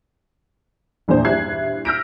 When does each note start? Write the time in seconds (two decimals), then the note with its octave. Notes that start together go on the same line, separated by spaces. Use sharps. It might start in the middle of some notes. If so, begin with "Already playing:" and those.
1.08 A#1 E2 A#2 D4 C5
1.25 G2 E4 F#6 G#6 C7
1.85 E6 F6 G6 A#6 B6 D7